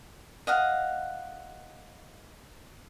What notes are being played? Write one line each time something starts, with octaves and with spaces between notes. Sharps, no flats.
D#5 F5 F#5